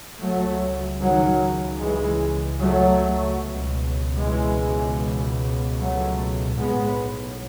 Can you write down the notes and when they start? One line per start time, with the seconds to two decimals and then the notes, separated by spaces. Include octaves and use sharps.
0.22 C#2 C#3 F#3 A3
1.02 D#3 F#3
1.81 E3 G#3
2.60 F#3 A3
3.41 C#2 B2
4.20 E3 G#3
5.78 F#3 A3
6.57 B1 A2 G#3 B3